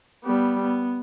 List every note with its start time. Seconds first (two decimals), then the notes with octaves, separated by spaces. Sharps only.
0.24 G3 B3
0.63 B3